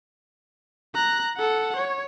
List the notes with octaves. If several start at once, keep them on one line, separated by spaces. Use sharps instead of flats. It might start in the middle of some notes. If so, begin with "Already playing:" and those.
A#5 F#6
A4 F#5
C#5